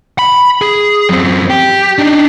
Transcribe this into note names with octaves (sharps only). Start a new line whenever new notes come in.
B5
G#4
F#2 C4
G4
D4 D#4